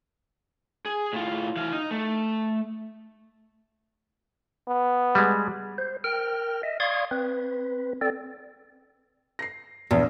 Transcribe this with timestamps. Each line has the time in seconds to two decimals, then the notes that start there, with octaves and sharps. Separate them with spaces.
0.86 G#4
1.13 A2 F4
1.56 E3 F5
1.73 D#4
1.91 A3
4.68 B3
5.15 G3 G#3
5.78 C5
6.04 A#4 G5 F6
6.63 D#5 E5
6.80 D5 F5 C6 C#6 D#6 G#6
7.11 C4 B4
8.01 C4 A4 D5
9.39 A#6 C7
9.91 A#1 E2